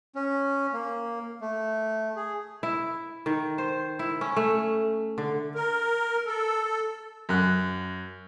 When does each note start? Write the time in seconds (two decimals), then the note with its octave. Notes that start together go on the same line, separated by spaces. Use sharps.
0.16 C#4
0.73 A#3
1.41 A3
2.16 G#4
2.63 E4
3.26 D#3
3.58 C5
3.99 E4
4.21 C#4
4.36 A3
5.18 D3
5.55 A#4
6.26 A4
7.29 F#2 F#6